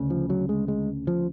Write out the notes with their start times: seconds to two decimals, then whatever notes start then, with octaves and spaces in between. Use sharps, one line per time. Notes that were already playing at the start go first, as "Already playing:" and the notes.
Already playing: D2 C#3
0.10 F3
0.30 F#3
0.49 G#3
0.68 G#3
1.07 F3